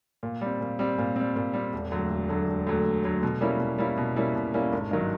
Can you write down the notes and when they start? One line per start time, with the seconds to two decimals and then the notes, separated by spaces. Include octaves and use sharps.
0.23 A#2
0.41 G3 C4
0.61 A#2
0.79 G3 C4
0.98 A#2
1.16 G3 C4
1.36 A#2
1.53 G3 C4
1.73 E1
1.91 D2 D3 F#3
2.10 E1
2.29 D2 D3 F#3
2.47 E1
2.67 D2 D3 F#3
2.85 E1
3.04 D2 D3 F#3
3.23 B2
3.41 G3 A#3 C#4 E4
3.60 B2
3.78 G3 A#3 C#4 E4
3.98 B2
4.16 G3 A#3 C#4 E4
4.35 B2
4.54 G3 A#3 C#4 E4
4.73 G#1
4.91 G2 D#3 F#3